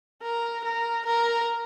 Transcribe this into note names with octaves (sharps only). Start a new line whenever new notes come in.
A#4
A#4
A#4